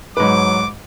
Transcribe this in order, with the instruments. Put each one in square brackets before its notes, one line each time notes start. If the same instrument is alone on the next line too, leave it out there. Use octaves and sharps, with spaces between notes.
[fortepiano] G#2 B4 [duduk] F#3 [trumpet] D6